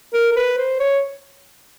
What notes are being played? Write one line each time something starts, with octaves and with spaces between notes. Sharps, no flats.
A#4
A#4
B4
C5
C#5